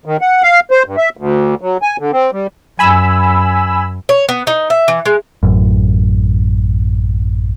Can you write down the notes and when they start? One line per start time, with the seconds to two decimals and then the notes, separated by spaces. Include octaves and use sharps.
0.06 D#3
0.21 F#5
0.43 F5
0.71 C5
0.86 G2
0.97 E5
1.17 D2
1.61 F#3
1.82 G#5
1.99 D3
2.12 C4
2.33 G3
2.79 F#2 G#5 B5 E6
4.09 C#5
4.29 B3
4.47 D#4
4.70 E5
4.88 E3
5.06 G#3
5.43 A1 F#2